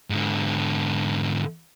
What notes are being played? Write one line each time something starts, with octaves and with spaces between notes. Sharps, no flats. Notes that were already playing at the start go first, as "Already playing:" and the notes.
G#2 D3